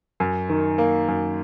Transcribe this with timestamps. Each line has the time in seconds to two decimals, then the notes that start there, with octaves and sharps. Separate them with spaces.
0.20 F#2
0.49 D#3
0.78 A#3
1.08 F#2